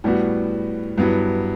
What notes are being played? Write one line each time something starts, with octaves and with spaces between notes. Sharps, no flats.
A2 G3 B3 F#4
G2 F#3 B3 E4